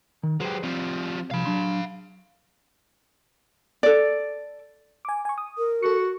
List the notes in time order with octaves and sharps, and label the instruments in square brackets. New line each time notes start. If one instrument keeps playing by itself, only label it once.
[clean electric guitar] D#3
[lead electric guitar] F#3 G4 [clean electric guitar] G#4 B4 C5
[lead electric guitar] F3 G3 [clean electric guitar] C4
[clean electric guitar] C2 F3 [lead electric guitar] F5 B5
[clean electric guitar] F#3 D4 C6
[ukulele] A4 D5
[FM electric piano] G#5 D6
G#5 C#6
D#6
[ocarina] A#4
[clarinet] F#4 [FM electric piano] A4 C#7